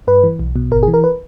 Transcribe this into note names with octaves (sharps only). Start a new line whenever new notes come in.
G2 B4
E3
B1
B2
G#1 A#4
G#4
E3
A#4
B4